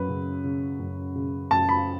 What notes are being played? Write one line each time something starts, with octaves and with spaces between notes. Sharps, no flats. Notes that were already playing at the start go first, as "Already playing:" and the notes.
Already playing: F#2 F#3 B4
C#3
C#3
F#2
C#3
F#2 A5
B5